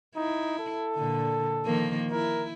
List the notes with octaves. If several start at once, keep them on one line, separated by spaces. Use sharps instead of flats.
D#4 E4
A4
A#2 D3
D#3 F3 A#3
E4 A#4